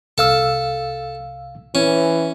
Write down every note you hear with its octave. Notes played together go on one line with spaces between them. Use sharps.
C2 A4 F5 E6
E3 C#4